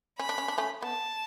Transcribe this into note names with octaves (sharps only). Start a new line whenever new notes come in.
C#4 B5
D4
C#4
D4
A3 C#4
B3 A5